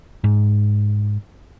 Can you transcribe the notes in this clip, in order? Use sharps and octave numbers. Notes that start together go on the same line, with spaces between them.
G#2